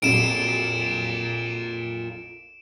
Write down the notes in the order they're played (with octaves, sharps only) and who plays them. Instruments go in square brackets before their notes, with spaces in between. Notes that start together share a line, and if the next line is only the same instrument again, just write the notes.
[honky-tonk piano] A#1 F2 F#3 [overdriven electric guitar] F4 A#4 [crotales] D7 E7